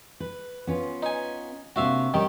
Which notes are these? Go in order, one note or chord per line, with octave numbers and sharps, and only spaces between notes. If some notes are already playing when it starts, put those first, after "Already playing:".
B4
B3 C#4 F4
D#4 G#5
C3 A#3 D4 F#4 E5 F5
D#3 G3 C#4 G4